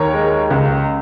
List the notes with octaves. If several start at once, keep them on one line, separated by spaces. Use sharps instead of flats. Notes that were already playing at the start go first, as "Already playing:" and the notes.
Already playing: D#2 A#4 C#5
G#3
C#2